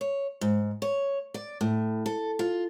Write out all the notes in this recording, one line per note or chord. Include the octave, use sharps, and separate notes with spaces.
C#5
G#2
C#5
D5
A2
A4
F4